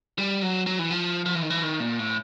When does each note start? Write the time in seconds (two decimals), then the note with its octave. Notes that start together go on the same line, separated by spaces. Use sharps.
0.18 G3
0.42 F#3
0.67 F#3
0.79 E3
0.90 F3
1.26 F3
1.35 E3
1.42 D#3
1.50 E3
1.63 D#3
1.80 A#2
1.99 A2